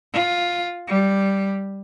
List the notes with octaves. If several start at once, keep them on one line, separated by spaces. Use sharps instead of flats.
F4
G3